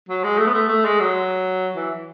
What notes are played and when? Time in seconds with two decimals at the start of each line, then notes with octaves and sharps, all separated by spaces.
0.09 F#3
0.24 G#3
0.39 A3
0.47 B3
0.54 A3
0.69 A3
0.85 G#3
1.00 F#3
1.76 E3